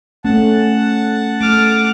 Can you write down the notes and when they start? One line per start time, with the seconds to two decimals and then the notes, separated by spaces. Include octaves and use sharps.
0.25 A3 C#4 F#5 A5
1.40 A3 D6 F6